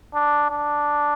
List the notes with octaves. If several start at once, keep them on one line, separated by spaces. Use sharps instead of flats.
D4
D4